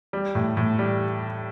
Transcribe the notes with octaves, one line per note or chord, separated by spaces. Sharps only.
G3
A2
A2
G3